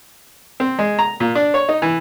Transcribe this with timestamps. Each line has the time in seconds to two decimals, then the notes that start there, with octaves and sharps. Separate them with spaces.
0.60 C4
0.79 G#3
0.99 A#5
1.20 A#2
1.35 D4
1.54 C#5
1.69 D#4
1.82 E3